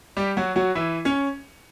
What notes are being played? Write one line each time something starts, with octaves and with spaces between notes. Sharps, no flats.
G3 G4
F#3 F#4
F#3 F#4
E3 E4
C#4 C#5